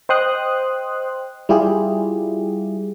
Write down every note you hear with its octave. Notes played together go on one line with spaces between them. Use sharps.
C5 D#5 G5 C6 D#6 F#6
G3 E4 F4 G4 G#4